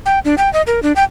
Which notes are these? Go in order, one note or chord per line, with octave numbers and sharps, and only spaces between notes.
G5
D4
G5
D#5
A#4
D4
G5